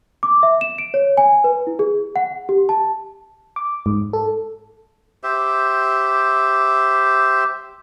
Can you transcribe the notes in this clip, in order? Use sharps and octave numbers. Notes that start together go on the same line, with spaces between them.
D6
E5
E7
D7
C#5
G#5
B4
E4
G#4
F#5
G4
A5
D6
G#2
A4
G4 C5 E5